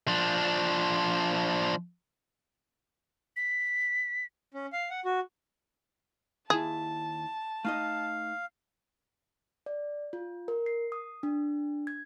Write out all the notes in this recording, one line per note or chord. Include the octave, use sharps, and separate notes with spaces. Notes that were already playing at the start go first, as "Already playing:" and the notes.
F3 D4
B6
C#4
F5
F#5
F#4
D#2 E4 G#4 A5
A3 D#4 D#5 F5
D5
F4
A#4
C7
D#6
D4
G#6